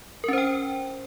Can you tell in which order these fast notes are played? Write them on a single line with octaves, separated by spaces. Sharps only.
A#4 C#4 C5 G5